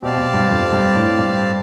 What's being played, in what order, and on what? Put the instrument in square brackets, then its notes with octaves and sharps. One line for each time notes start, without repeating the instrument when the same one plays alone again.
[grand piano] B2 [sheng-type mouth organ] C4 G4 D5 F5 A5
[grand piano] B2
G2
F2
G2
A2
G2